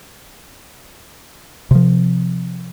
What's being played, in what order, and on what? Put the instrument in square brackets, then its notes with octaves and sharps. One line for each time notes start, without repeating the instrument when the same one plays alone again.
[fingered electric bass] C3 F3